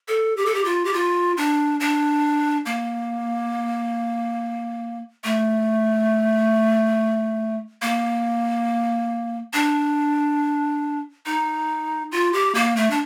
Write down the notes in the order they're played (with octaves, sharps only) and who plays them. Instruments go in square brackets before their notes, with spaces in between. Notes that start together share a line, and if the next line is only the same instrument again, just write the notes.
[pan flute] A4
G4
A4
G4
F4
G4
F4
D4
D4
A#3
A3
A#3
D4
D#4
F4
G4
A#3
A3
D4